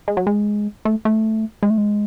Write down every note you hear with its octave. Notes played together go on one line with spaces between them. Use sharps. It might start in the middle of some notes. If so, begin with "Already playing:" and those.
G#3
F#3
G#3
A3
A3
G#3
A3
G#3